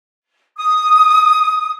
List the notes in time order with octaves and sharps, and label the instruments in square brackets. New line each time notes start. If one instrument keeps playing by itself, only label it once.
[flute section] D#6